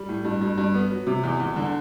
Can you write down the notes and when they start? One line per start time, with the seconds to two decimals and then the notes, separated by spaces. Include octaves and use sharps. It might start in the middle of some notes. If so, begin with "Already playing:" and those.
Already playing: G3
0.09 A2
0.25 G2
0.41 G2
0.58 G2
0.74 B3
0.90 F#3
1.07 C3
1.24 E2
1.40 E2
1.56 D3